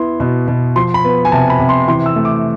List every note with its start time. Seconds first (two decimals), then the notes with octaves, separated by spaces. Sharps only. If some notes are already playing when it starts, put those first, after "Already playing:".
Already playing: B3 E4 C6
0.20 B2
0.48 B2
0.76 F3 C6
0.94 B5
1.04 B3
1.25 G#5
1.32 C3 A5
1.50 B5
1.59 C3
1.69 C6
1.88 E3 C6
2.06 E6
2.16 A3
2.25 D6